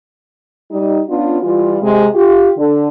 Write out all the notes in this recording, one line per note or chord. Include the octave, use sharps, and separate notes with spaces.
G3 D#4
B3 C#4 D4 F4
E3 G3 F4
C3 G#3
F4 G4
D3